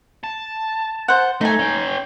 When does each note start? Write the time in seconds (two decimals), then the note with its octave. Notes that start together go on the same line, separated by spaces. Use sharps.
0.24 A5
1.08 C5 F#5
1.41 A3 D#4 G#5
1.59 C#4 G5